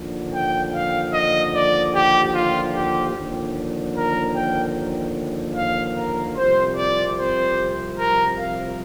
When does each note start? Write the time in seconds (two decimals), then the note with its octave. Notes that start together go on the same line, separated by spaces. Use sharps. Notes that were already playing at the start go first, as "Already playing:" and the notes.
Already playing: D#2 D3 F3
0.33 G5
0.74 F5
1.13 D#5
1.54 D5
1.94 G4
2.34 F4
2.75 G4
3.14 D#2 D3 F3
3.95 A#4
4.34 G5
5.55 F5
5.95 A#4
6.36 C2 C3 F3 C5
6.76 D5
7.17 C5
7.97 A#4
8.37 F5